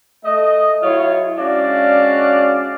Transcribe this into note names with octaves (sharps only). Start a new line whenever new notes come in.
A3 D#5
F#3 E4 F4 G#4 C#5
G#3 C#4 D4 F#4 D5 F5